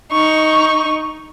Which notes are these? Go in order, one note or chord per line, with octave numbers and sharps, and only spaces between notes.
D#4 C#6